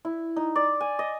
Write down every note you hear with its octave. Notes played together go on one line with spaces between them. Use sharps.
E4
D#4
D5
G#5
D#5